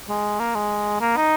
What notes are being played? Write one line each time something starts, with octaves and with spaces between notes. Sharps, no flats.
G#3
A#3
G#3
A#3
D#4